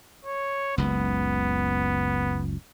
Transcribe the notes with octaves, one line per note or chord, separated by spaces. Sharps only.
C#5
F#1 C#2 B3